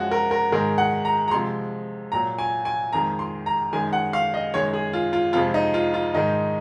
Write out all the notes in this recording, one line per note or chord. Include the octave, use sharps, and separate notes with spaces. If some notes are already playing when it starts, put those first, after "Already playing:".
Already playing: F#2 F3 G#3 F#4
A#4
A#4
G#2 D#3 G#3 A#4
F#5
A#5
A#5
C3 F3 G#3 C6
A#2 F#3 A#5
G#5
G#5
F2 D#3 G#3 A#5
C6
A#5
F#2 D#3 G#3 G#5
F#5
F5
D#5
F#2 D#3 G#3 C#5
G#4
F4
F4
F2 C3 F3 G#3 F4
D#4
F4
F4
G#2 D#3 G#3 D#4